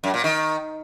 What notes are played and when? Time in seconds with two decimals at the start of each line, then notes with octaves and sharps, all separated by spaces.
0.04 F#2
0.14 A#2
0.24 D#3